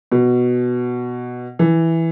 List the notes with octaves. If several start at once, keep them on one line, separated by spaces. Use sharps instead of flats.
B2
E3